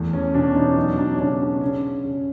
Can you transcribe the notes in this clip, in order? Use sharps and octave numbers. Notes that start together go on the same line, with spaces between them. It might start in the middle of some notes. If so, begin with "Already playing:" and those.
Already playing: E2 A3
C#4
B2 D4
C#4 D#4
F#3 C#4 D#4
D4
C#4
C#3 D4
D4
C#3 C#4
C#3 C#4